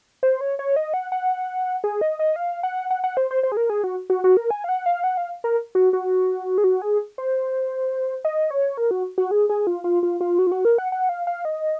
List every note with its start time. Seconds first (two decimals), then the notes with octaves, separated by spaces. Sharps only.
0.23 C5
0.41 C#5
0.59 C#5
0.76 D#5
0.94 F#5
1.12 F#5
1.84 G#4
2.01 D#5
2.19 D#5
2.36 F5
2.63 F#5
2.91 F#5
3.04 F#5
3.17 C5
3.31 C5
3.43 C5
3.52 G#4
3.57 A#4
3.70 G#4
3.84 F#4
4.10 F#4
4.24 F#4
4.37 A#4
4.51 G#5
4.64 F5
4.69 F#5
4.86 F5
5.04 F#5
5.17 F5
5.44 A#4
5.75 F#4
5.93 F#4
6.58 G#4
6.64 F#4
6.82 G#4
7.18 C5
8.25 D#5
8.51 C#5
8.77 A#4
8.91 F#4
9.18 F#4
9.31 G#4
9.49 G#4
9.67 F4
9.84 F4
10.03 F4
10.21 F4
10.39 F#4
10.47 F4
10.52 F#4
10.65 A#4
10.78 F#5
10.92 F#5
11.09 F5
11.27 F5
11.45 D#5